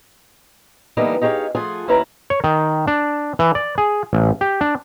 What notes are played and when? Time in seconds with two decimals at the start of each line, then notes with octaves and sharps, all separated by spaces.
0.97 D3 E3 G3 A#3 B3 D#4
1.21 D#4 G4 G#4 C5 C#5 F5
1.55 F3 A3 F4 G#4 F#5 G#5
1.88 D#2 C#4 E4 B4 A#5
2.30 C#5
2.44 D#3
2.88 D4
3.39 E3
3.55 D5
3.78 G#4
4.13 A1
4.41 G4
4.61 D4